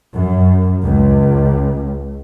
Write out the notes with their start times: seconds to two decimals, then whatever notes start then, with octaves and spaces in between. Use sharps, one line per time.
0.13 F#2
0.84 C#2